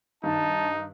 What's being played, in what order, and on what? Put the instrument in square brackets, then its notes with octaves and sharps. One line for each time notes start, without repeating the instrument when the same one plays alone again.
[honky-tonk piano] G2 D#3 [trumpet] D#4 [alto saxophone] A5